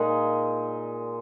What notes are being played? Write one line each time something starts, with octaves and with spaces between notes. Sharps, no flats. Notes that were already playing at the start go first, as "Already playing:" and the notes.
Already playing: A#2 G#3 D#4